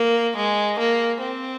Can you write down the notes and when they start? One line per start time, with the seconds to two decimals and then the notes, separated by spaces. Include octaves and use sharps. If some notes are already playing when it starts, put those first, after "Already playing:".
Already playing: A#3
0.36 G#3
0.79 A#3
1.21 C4